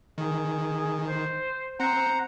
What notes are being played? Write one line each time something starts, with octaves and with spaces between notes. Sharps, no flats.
D#3 G#4
C5
C4 C5 F#5 A#5